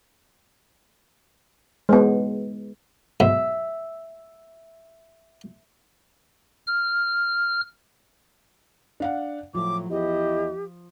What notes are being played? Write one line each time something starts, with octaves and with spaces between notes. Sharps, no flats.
G#3 B3
B1 G#2 E5
F6
D4 F5 F#5
A2 F3 F#3 D6
E2 E4 G4 D#5